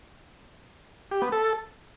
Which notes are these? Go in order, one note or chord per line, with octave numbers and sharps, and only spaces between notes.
G4
B3
A4